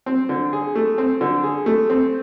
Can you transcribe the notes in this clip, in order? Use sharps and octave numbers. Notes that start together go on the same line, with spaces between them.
C4
D3
G#4
A3
C4
D3
G#4
A3
C4